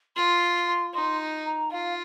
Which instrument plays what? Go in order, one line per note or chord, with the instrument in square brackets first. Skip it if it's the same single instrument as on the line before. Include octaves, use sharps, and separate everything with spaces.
[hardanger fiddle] F4 [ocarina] C6
[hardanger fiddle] D#4 [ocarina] C6
[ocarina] A#5
[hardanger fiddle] F4 [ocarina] F5